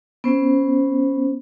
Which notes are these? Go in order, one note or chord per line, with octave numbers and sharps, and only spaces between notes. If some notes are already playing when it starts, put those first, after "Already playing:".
B3 C#4 C5